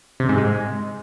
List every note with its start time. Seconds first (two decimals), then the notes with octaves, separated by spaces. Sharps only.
0.20 C3
0.29 G#2
0.38 G#3